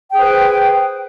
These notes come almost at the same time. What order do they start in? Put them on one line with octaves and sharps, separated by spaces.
G5 G#4 C5 B4